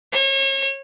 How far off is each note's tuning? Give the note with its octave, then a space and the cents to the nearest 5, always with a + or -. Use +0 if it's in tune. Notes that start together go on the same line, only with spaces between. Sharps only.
C#5 -35